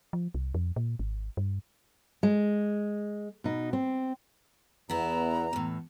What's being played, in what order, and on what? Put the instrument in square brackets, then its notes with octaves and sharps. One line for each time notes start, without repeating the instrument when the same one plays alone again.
[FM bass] F3
C2
F2
A#2
G#1
G2
[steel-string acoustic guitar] G#3
B2 D#4
C4
[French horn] E2 [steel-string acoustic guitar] B3 E4 [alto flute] A#5
[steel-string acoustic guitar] E2 A2